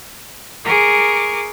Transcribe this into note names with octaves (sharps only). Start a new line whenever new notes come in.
G#4 A#4 C#6 D6